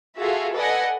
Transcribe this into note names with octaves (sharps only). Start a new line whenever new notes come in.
F4 F#4 G#4 A4 E5
A4 B4 D5 D#5 F#5 G#5